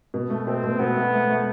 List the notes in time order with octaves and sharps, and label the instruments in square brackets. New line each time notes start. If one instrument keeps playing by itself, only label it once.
[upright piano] B2
A3
[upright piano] B2 [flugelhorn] C4
[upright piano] B2
[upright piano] B2 [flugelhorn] B3
[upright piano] A3
A3
A3